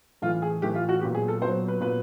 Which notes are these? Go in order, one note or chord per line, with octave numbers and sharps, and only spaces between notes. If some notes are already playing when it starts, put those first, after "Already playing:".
A2 E3 A3 F4
G#4
A2 E3 A3 G4
F4
F#4
A#2 F#3 B3 G4
G#4
A4
A#2 F#3 B3 C5
B4
A#2 F#3 B3 B4